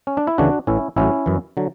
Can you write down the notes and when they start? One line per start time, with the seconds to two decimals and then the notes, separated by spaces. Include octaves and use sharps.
0.07 C#4
0.17 D4
0.27 E4
0.38 D2 C#3 E3 D4 F#4
0.67 A1 A2 E3 C#4 E4
0.96 A1 A2 F#3 C#4 E4
1.26 F#2 E3
1.57 D3 F#3